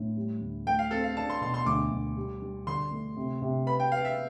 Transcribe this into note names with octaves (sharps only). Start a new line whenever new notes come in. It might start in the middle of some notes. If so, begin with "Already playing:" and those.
Already playing: A2
G3
D2
A3 G5
F5
C4 A4
F5
D4 A5
C6
B2 C6
C6
D2 D6
D2
G3
G3
D3 C6
A3
C3
C3
B4 B5
G5
B4 F5
E5